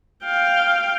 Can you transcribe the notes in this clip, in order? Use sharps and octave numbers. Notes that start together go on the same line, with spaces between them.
F5 G5